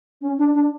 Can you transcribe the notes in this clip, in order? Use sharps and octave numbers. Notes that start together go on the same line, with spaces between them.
C#4
D4
D4